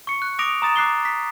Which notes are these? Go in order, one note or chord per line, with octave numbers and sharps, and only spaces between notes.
C#6 C#7
F#6
D6 D#6 A#6 D7 F7
A#5 D#6 A6 E7
D6 F#6 C7 G7
B6